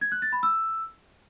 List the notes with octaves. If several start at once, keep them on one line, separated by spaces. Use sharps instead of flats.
G#6
F#6
A6
B5
E6